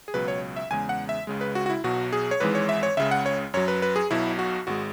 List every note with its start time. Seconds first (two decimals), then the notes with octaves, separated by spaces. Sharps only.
0.08 G#4
0.14 C#2 B2 F#3 B4
0.28 C#5
0.56 E5
0.70 E2 C#3 G#3 G#5
0.89 F#5
1.09 E5
1.27 C#2 C#3 G#3
1.41 B4
1.55 F#4
1.66 F#4
1.70 E4
1.84 B1 B2 F#3 F#4
2.13 G#4
2.31 C#5
2.40 G#1 G#2 E3 G#3 B4
2.55 C#5
2.69 E5
2.83 C#5
2.97 C#2 C#3 G#3 E5
3.11 F#5
3.26 C#5
3.54 F#2 F#3 C#5
3.68 B4
3.82 B4
3.96 G#4
4.10 B1 B2 F#3 E4
4.39 F#4
4.67 G#1 G#3 F#4